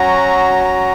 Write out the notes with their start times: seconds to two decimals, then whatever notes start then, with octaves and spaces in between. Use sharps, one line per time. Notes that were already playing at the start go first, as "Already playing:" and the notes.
Already playing: F#3 C#4 F#4 A#5
0.64 A#5